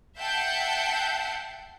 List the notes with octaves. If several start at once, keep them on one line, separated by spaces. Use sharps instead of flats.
E5 F#5 G5 A5 G6 C7